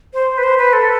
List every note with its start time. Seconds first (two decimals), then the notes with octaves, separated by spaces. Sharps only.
0.14 C5
0.38 B4
0.44 C5
0.58 B4
0.73 A4